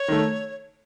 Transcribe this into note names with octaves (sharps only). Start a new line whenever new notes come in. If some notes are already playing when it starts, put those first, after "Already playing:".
Already playing: C#5
D#3 A3